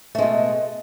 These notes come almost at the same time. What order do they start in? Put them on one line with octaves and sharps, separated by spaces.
A3 G#3 B2